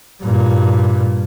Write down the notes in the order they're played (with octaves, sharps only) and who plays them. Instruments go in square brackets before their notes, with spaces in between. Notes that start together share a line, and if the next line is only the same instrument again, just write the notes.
[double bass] G2 A#2